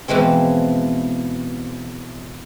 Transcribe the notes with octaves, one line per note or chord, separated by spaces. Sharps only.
B2 E3 F3 G#3 C4